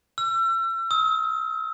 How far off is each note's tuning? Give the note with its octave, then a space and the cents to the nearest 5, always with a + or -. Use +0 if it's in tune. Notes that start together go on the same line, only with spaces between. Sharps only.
E6 +35
E6 -45